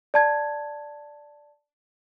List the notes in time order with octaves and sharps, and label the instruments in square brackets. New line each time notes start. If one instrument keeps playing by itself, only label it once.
[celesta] D5 A5 G#6